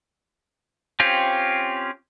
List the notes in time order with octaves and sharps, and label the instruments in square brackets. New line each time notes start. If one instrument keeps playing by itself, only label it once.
[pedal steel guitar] C4 C#4 F4 G4